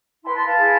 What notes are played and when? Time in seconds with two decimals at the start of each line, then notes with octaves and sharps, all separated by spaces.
0.23 E4 A5 C6
0.27 B4
0.34 A5 C6
0.44 F5 A5
0.55 E4 G#4 B4